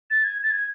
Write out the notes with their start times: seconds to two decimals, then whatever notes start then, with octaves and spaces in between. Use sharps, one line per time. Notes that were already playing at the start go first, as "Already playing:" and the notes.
0.11 A6
0.24 G#6
0.43 A6
0.51 G#6